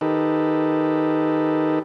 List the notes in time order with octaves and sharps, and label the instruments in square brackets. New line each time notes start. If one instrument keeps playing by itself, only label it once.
[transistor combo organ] D#3 D#4 G4 A4 B4